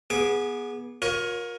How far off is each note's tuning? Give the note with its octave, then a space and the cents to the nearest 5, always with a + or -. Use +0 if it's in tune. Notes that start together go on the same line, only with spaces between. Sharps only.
B3 -20 G#4 +0 D6 +0
F4 +40 A#4 +20 C#5 +0